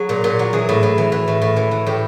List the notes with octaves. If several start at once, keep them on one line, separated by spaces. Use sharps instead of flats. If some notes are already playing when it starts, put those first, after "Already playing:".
Already playing: F#3 G#4
A#2
A#2
F#3
E3 G#4
A2
A2
E3
E3
A2
A2
E3
E3
A2 G4